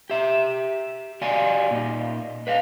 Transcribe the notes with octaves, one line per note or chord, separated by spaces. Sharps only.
G4 E5
F#4 G4 D5 F5 G#5
A#2 D#4
B4 D#5 F5